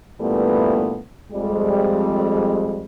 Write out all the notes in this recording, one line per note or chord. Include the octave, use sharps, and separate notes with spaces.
G2 A#2 E3 G3 A3 B3
F2 G3 G#3